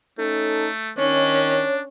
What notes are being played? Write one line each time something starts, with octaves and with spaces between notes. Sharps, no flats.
A3 C#4 D#4 A4
D#3 C#4 D4 C#5